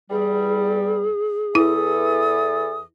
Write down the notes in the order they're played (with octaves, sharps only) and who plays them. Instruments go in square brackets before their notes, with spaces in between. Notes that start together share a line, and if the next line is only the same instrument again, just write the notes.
[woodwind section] E2 G3 [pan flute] G#4
[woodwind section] E2 E3 A4 [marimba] E4 [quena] D#6